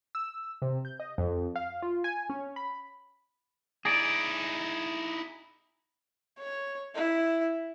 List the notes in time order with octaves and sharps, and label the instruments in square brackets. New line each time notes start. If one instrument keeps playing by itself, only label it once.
[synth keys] E6
C3
G6
D#5
F2
F5
F4
G#5
C#4
B5
[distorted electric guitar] D#4 E4 [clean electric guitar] G#4 D5
[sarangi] C#5
E4